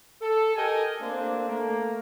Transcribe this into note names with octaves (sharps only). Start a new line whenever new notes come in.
A4
G4 A4 A#4 D#5 G5 G#5
A3 A#3 C4 D4
A3 A#3